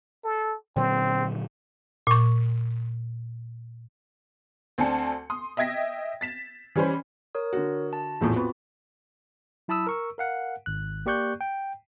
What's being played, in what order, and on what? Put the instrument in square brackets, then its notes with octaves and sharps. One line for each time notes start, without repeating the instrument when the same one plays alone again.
[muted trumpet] A4
[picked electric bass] A#2 D3 F#3 [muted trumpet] C4
[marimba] A#2 C#6
[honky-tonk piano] D2 C4 D4 G#5 A5 C#7
C6 D#6
D#5 E5 G5 G#6 A#6 B6
A6 B6 E7
E3 G3 C#4 C5 B5
[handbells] A#4 C#5 D#6
[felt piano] D3 F#4
[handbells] A5
[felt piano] A#1 E2 A2 [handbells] F4 F#4
[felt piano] B3 [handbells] C4
[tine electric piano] F#3 E4 A5 B5 D#6 E6
A#4 C#6 E6
A#4 F5 F#5
G#1 F#6
A#3 G4 D5 C#6 F#6 G6
G5